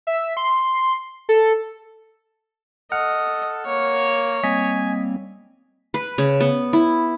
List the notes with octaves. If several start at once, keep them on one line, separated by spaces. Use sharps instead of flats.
E5
C6
A4
A4 D#5 F#5 F6
A#3 C#5
G3 A#3 C4 D#5 G#5 B6
B4
C#3
B3
E4